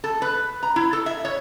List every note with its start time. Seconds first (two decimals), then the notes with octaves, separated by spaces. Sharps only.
0.04 A4
0.22 B4
0.63 A#5
0.76 E4
0.93 A4
1.06 E5
1.25 C#5